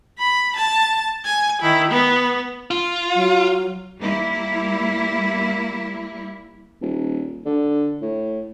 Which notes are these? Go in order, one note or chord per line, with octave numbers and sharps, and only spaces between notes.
B5
A5
G#5
D#3 E4
B3
F4
F#3
G3 A#3 E4
D#1
D3
A2